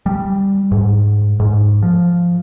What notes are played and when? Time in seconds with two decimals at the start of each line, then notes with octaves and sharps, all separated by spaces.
0.06 G3
0.72 G#2
1.40 G#2
1.82 F3